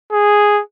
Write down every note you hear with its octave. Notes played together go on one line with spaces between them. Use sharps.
G#4